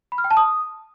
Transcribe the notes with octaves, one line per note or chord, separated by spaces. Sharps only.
B5
F6
G5
A5
D#6